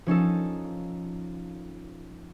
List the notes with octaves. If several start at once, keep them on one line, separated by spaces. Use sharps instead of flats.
F3 C#4 D#4 A4